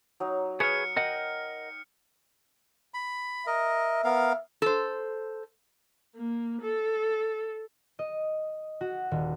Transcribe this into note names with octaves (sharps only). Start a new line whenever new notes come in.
F#3 D#4
G#4 B4 C#5 F6 C#7
A#4 D#5 F#5 G5
B5
A#4 D#5 E5
B3 A#4 F5
A4 C5
A#3
A4
D#5
F#4
D#1